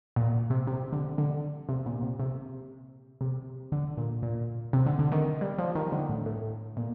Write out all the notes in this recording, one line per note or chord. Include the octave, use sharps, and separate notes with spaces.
A#2
C3
C3
D3
D3
C3
A#2
C3
C3
C3
D3
A#2
A#2
C3
D3
D3
D#3
G3
F3
D#3
D3
A2
A2
A#2